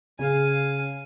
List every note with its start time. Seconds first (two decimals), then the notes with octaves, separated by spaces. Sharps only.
0.19 C#3 F5 G#5